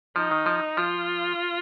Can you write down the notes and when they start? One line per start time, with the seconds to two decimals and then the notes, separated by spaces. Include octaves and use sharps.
0.16 F3 D#4
0.31 D#3
0.46 F3
0.77 F3 F4